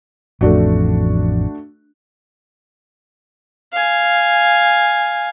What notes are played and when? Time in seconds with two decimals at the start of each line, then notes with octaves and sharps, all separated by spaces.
0.41 A1 F2 A3 D4 F#4
3.73 F5 G#5